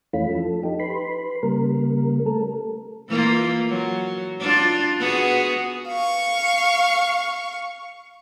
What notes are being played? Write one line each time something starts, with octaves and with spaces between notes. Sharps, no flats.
F2 E3 A3 C#4 F4 B5
F3 A4
D#4 G4
B4 B5 C6
C#3 G3 A#3 A#4
A3 A4 A#4
E3 A#3 F4
F#3
D4 F4
B3 F#4 G#4
F5 C#6